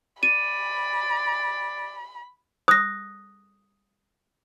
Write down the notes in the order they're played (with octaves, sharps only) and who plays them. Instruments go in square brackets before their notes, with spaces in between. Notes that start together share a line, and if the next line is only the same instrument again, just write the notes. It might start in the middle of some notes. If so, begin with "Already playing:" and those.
[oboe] D5 [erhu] B5 [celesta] D#7
[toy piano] D#6 [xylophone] F#6 A#6